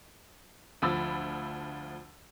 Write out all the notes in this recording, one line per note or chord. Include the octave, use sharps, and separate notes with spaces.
D2 F3 B5 E6 A6